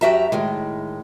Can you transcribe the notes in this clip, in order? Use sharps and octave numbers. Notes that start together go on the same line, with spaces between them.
F#2 F#4 G4 E5 A5 A#5
A2 D#3 G#3